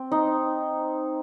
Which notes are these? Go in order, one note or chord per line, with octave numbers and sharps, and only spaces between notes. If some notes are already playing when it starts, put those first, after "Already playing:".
Already playing: C4
D#4